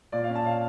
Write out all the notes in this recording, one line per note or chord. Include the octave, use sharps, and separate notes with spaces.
A#2 D5
F5
C#4
A5
F5